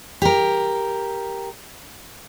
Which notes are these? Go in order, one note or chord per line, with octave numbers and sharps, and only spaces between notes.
G4 A#4